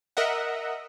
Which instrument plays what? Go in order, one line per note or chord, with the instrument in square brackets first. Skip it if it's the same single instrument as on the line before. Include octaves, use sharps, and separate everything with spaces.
[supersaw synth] A#4 D#5 E5 F#5